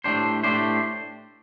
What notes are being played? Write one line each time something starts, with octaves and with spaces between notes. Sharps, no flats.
A2 A3 D4 G4 C5
A2 A3 D4 G4 C5